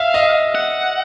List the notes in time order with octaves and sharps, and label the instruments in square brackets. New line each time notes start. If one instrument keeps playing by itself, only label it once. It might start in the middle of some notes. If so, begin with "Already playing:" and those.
Already playing: [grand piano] E5 [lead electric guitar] F5
[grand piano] D#5
[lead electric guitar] F#5